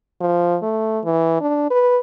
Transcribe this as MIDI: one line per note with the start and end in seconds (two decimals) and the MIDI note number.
0.21 0.57 53
0.63 0.99 57
1.05 1.40 52
1.41 1.68 62
1.70 2.00 71